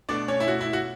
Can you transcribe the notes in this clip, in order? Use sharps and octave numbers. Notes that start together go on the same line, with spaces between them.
B2 A3 D4 D5
C#4 C#5
E4
F#4
E4
F#4